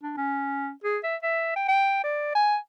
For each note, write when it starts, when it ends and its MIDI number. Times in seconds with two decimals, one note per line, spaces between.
0.04 0.14 62
0.18 0.71 61
0.84 0.99 68
1.04 1.16 76
1.23 1.52 76
1.56 1.64 79
1.69 1.99 79
2.04 2.32 74
2.35 2.57 80